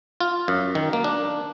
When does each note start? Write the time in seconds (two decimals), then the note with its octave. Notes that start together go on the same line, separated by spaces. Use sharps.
0.20 F4
0.48 F#2
0.75 D#3
0.93 A#3
1.04 D4